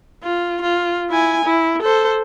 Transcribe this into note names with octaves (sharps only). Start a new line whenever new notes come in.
F4
F4
E4 G#5
E4
A4 C5